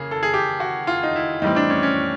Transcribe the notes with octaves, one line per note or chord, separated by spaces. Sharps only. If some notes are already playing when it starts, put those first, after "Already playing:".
Already playing: C#3 A#3 G#4
A4
G#4
G4
F#4
F4
D#4
E4
A2 E3 G3 C4 D#4
D4
C#4
C#4